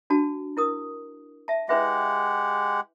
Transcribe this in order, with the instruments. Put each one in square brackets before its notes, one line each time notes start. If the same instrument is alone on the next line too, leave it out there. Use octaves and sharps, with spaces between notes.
[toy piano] D4 F#4 A5
E4 A#4 D#6
E5 A5
[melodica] G#3 G4 F#5 [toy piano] E4 B4 E5